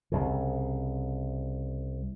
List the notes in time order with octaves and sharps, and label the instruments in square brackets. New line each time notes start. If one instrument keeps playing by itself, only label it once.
[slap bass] C2 C#3